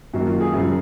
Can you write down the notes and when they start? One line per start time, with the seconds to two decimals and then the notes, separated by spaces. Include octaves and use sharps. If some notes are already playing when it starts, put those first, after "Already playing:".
0.13 F#2 D#3 A#3 F#4
0.27 F4
0.40 G#4
0.53 F#2 C#3 F#3 G#4